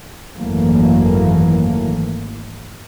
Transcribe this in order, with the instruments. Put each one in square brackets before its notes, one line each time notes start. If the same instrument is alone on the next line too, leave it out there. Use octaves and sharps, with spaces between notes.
[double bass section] G#1 F#2 E3 F#3 A3 A#3